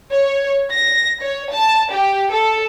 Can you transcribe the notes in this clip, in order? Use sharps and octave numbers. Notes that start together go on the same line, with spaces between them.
C#5
A#6
C#5
A5
G4
A4